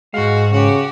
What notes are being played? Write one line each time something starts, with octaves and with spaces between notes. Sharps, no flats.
G#2 G#3 F#4 F5
C#3 F#4 G4